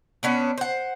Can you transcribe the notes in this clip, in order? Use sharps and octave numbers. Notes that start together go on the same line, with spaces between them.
B3 C#4 D4
C5 F#5